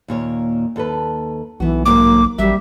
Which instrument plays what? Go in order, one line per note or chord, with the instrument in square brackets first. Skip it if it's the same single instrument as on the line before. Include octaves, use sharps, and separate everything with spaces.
[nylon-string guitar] D#2 A#2 C#5
D#2 A4 B4
[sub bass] B1 [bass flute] E3 [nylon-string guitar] B3 F#4
[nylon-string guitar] D#2 G#2 F#3 [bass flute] A#3 [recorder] D6
[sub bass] A1 [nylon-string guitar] F#3 [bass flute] G3 [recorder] E5